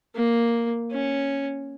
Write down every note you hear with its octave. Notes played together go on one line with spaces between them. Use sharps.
A#3
C#4